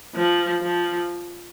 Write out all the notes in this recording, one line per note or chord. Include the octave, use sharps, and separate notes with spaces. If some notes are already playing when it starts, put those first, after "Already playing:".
F3
F3